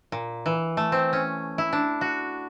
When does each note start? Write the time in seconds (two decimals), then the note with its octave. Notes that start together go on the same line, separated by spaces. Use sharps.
0.12 A#2
0.46 E3
0.77 A3
0.92 C4
1.13 C#4
1.58 E4
1.73 D4
2.01 F#4